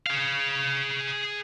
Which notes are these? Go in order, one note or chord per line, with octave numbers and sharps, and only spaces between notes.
G#4 F5